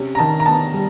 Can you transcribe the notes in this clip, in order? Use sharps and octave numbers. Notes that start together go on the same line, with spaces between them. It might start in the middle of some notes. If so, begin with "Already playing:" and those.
Already playing: C3 C#4
A#5
D#3 A5
A#5
B3 A5
G3